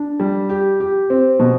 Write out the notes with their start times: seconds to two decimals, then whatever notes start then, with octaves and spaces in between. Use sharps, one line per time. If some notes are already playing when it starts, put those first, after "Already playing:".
Already playing: D4
0.20 G3
0.49 G4
0.80 G4
1.10 C4
1.39 B2